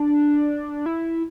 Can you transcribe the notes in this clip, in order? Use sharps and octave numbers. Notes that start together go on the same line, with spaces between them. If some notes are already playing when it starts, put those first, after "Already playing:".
Already playing: D4
E4